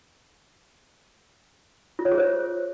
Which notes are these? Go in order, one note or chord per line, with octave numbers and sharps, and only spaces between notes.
F4
C#5
G#4
C5